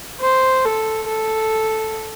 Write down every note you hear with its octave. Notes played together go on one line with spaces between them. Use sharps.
C5
A4
A4